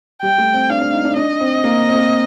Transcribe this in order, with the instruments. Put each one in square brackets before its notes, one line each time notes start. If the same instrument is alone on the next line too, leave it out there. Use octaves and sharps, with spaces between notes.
[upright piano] G3 [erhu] G5
[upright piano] A3
C4
[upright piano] D4 [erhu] F5
[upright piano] D4
D#4
D4
[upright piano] D4 [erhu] D#5
[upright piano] C4
A#3
C4
A#3